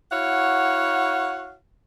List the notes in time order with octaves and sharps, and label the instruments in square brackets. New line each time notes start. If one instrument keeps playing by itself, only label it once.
[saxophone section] E4 F#4 C#5 F5 F#5